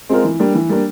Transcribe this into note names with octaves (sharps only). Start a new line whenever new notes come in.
G#3 C4 F4 A#4
E3
G3 A#3 D4
E3
G3 A#3 D4